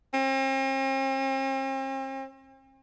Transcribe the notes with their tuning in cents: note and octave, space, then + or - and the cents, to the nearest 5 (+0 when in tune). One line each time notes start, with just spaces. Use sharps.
C4 +45